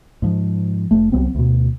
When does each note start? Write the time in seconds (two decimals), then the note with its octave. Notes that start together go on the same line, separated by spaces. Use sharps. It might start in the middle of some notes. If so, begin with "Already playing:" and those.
0.22 G#2 F3
0.91 F1 A3
1.12 C2 F#3 B3 C4
1.35 D2 B2